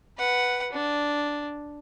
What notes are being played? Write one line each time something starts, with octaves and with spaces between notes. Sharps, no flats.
B4 F#5
D4